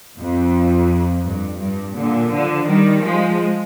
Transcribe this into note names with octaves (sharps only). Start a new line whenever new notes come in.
F2
G2
G2
A#2 D3
D3 F3
D#3 G3
F3 G#3